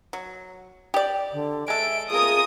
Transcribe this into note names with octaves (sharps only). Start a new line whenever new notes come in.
F#3
G4 D5
D3
G#3 A4 E5 D7
F4 G#4 A#4 D#6